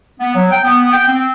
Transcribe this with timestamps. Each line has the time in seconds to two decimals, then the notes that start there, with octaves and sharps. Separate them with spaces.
0.20 B3
0.35 F#3
0.51 G5
0.64 B3
0.92 G5
1.07 C4